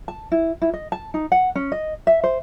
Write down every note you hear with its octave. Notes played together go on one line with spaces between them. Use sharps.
A5
E4
E4
D#5
A5
D#4
F#5
C#4
D#5
E5
C5